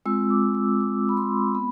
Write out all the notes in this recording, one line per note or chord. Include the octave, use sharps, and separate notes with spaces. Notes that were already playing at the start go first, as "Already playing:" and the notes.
G#3 C4 F4 E6
D6
E6
D6
B5
C6
B3 B5